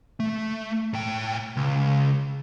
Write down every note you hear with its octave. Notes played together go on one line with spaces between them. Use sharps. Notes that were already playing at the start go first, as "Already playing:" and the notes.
A3
A2 G5
C#2